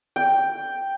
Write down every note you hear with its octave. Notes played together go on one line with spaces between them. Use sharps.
G5